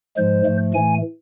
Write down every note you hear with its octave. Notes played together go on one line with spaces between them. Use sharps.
G#2 F3 G#3 C5
G#2 F3 A3
A2 E3 A3 G#5